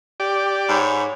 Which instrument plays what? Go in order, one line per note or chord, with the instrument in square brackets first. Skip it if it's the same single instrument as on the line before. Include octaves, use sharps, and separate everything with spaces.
[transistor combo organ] G4 D5
[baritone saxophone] G#2 [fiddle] C#5 B5